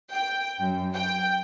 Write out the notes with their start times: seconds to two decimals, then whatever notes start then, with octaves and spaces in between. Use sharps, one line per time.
0.12 G5
0.59 F#2
0.94 G5